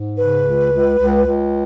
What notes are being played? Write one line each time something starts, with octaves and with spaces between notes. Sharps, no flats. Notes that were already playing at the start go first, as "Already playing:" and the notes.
Already playing: G#2
C#3 B4
C#2
C#2
C#2
C#2